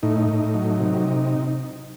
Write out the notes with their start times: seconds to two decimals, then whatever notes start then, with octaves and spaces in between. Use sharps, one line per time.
0.03 A2 D#4
0.29 A2
0.54 F#3
0.80 C3